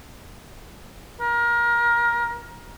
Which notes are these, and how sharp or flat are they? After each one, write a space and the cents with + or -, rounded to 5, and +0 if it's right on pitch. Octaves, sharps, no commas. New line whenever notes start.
A#4 +25